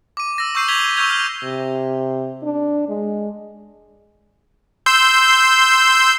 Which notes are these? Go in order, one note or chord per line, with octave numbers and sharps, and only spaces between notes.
D6 D#7
E6 A#6
C#6 E6 G6 C7 D#7
G#6 B6 F7 G7
C#6 E6 F6 G6 G#6 F7
F6 G6 F7
C3
D4
G#3
C6 E6 G6